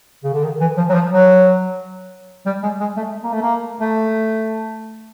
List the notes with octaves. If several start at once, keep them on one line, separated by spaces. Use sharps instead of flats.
C#3
D3
D#3
E3
F3
F#3
F3
F#3
G3
G#3
G#3
A3
A#3
A3
A#3
A3